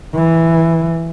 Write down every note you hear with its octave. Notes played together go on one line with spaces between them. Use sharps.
E3